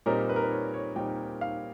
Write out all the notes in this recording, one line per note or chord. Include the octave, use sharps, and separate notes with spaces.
A#2 G3 C4 D#4 A#4
B4
A#4
B4
C#5
C#5
A#2 G3 C4 D#4 G5
F5